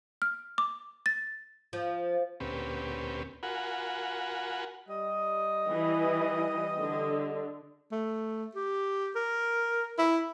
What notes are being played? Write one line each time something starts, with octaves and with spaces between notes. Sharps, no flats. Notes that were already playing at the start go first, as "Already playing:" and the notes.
F6
D6
A6
F3
D2 A#2 C4 C#4 G4 B4
F4 F#4 A#4 F#5 G#5 B5
G3 D#5
E3
D3
A3
G4
A#4
E4